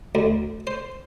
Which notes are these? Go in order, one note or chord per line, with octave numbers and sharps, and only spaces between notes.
D2
C5